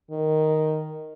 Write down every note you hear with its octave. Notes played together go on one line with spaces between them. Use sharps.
D#3